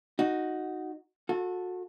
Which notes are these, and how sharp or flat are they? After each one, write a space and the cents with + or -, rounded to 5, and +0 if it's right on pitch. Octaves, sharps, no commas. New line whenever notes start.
D#4 +0 F#4 -5
F#4 -30 A4 +0